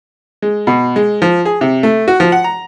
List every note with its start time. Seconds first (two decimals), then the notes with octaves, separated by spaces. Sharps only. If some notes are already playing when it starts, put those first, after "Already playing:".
0.42 G#3
0.67 B2
0.96 G#3
1.22 F3
1.45 G#4
1.61 C3
1.83 A3
2.08 F#4
2.20 F3
2.32 F#5
2.44 A#5